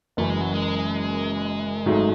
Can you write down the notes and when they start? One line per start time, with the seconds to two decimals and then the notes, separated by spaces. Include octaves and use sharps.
0.17 F#1 F#2 E3 A3
0.30 G#3
0.41 F#3
0.54 G#3
1.86 G#1 G#2 F#3 A3